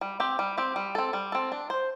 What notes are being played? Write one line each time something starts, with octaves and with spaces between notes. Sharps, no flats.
G3
C4 G4
G3
C4 G4
G3
C4 A4
G3
C4 A4
D4
C5